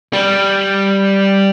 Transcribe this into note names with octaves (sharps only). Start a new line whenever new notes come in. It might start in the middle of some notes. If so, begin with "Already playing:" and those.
G3